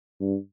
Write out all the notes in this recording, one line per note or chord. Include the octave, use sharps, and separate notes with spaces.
G2